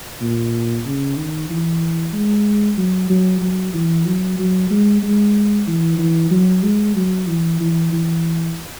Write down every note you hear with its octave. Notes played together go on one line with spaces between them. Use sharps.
A#2
C#3
D#3
E3
G#3
F#3
F#3
F#3
E3
F#3
F#3
G#3
G#3
E3
E3
F#3
G#3
F#3
E3
E3
E3